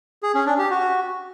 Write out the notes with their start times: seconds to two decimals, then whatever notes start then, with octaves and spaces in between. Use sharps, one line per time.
0.23 G#4
0.35 C#4
0.46 D4
0.58 G4
0.70 F#4